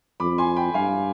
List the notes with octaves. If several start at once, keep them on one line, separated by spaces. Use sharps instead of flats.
F2 B5 D6
G#5 C6
G5 B5
G2 F5 G#5